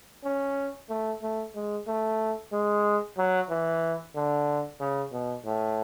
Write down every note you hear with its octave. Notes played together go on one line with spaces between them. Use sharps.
C#4
A3
A3
G#3
A3
G#3
F#3
E3
D3
C#3
B2
A2